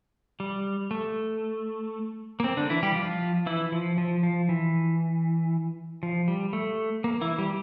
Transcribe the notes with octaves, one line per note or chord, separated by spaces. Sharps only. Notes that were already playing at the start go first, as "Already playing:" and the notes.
G3
A3
A#3
C4
D3 D4
E3 E4
G3 G4
F3 F4
E3 E4
F3
F3
F3
E3
F3
G3
A3
A#3
E3 E4
G3